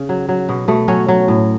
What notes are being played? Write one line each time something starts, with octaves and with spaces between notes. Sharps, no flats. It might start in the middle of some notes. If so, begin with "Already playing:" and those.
Already playing: C#3
F#3
F#3
B2
B2 A3
F#3 C#4
F#3
A2